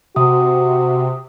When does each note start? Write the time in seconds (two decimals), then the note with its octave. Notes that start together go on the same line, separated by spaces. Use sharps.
0.16 C3 F#4 D#6